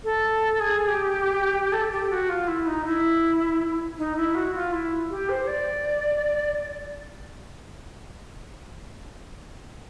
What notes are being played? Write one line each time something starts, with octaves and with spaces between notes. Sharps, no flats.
A4
G#4
G4
A4
G4
F#4
F4
E4
D#4
E4
D#4
E4
F#4
F4
E4
G4
C5
D5